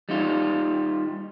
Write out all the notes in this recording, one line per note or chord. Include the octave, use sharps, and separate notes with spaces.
G3 D#4 F4